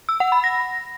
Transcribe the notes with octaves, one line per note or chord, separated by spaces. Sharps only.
E6
F#5
B5
A#6